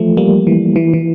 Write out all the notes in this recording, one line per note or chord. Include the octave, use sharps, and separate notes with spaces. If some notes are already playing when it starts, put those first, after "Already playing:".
Already playing: E3 F3 A3
G3 A#3
E3
E3
E3